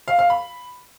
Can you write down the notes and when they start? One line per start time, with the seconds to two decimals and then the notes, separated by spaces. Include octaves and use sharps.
0.08 F5
0.19 F5
0.30 B5